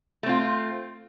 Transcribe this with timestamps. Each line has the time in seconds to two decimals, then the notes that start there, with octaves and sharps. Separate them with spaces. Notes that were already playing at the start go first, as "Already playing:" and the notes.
0.23 A3
0.26 C4
0.29 F4